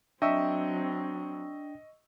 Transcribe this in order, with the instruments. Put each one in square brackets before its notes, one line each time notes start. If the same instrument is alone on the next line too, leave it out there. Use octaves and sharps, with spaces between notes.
[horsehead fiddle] F#3 C4 [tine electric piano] D4 G5 [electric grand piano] D#5 C#6 E6 [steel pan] E5